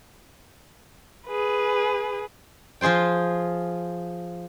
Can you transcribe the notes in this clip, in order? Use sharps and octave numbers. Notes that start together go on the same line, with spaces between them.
G#4 B4
F3 F4 G#4 C5 G5